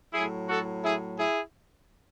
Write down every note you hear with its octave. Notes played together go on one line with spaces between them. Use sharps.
A2 F#3 E4 G#4
F#4 A4
E4 G#4
E4 G#4